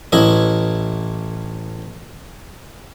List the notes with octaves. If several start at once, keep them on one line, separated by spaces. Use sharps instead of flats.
A1 E4 D#5